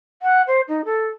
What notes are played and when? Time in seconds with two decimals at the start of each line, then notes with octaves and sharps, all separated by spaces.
0.22 F#5
0.47 C5
0.68 D#4
0.85 A4